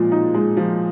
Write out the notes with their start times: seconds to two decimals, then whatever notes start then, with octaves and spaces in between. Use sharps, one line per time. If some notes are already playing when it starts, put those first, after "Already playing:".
Already playing: A#2 F3 G#3
0.12 D#4
0.34 G#3
0.57 F3